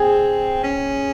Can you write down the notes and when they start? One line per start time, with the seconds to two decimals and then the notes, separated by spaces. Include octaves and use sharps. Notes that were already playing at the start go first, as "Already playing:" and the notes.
Already playing: C4 G#4
0.63 C#4